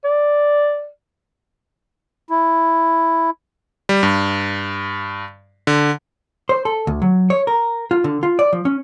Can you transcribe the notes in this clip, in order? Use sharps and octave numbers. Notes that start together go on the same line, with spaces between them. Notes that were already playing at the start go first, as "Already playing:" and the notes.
D5
E4
G3
G2
D3
C5
A4
D2
F#3
C#5
A#4
F4
D3
F4
D5
F3
C#4